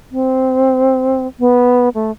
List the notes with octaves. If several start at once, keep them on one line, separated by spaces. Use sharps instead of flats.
C4
B3
A3